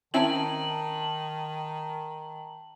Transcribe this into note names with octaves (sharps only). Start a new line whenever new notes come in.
D#3 C4 C#4 E4 A5 F#7